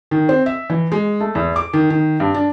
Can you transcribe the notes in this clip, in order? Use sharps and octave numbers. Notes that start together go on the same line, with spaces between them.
D#3
C4
E5
E3
G#3
A3
E2
D6
D#3
D#3
G2
D4